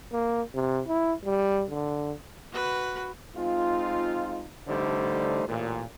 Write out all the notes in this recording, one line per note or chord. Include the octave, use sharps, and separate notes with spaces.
A#3
C3
E4
G3
D3
F#4 B4
G#3 C4 D#4 F4
A1 D3 G3 A3 D#4 C5
A1 A#2